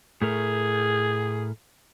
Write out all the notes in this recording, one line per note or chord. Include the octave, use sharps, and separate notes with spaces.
A2 A3 G#4 A#4